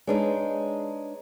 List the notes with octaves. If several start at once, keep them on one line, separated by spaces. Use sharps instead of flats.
G#3 D4 D#4 B4 C#5 D#5